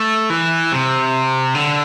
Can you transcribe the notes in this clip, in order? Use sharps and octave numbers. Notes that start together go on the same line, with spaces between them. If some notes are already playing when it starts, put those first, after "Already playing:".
Already playing: A3
E3
C3
D3